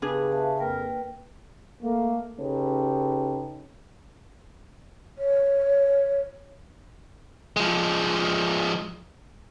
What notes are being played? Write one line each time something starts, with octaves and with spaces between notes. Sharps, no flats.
C#3 B3 D4 G4 G#4 B4
E5 F5 A5
F2 A#3 A#4 B4 G5
A3 A#3
C#3 C#4 D#4 G4 A4 B4
C#5
F3 G#3